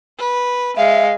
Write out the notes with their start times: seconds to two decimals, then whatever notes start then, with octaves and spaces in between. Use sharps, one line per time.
0.18 B4
0.77 G#3 E5 F5